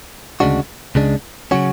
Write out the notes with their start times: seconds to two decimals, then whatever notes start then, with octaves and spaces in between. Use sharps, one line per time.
0.40 D2 C#3 G#3 D4 F#4
0.95 C#2 C#3 G#3 D4
1.51 C#3 F#3 C#4 F#4